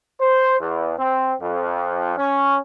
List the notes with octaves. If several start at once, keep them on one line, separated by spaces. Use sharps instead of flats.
C5
E2
C4
F2
C#4